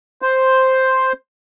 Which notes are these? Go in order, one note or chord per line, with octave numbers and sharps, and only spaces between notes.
C5